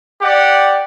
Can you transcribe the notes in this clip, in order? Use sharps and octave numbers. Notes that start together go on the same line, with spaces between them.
G4 D5 F#5